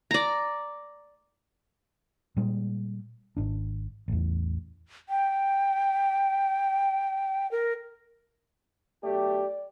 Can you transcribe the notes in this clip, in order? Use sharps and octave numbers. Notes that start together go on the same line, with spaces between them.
D5 A#5
A#2 G3 G#3
G#1 D4
A1 E2
G5
A#4
B1 A3 G4 D5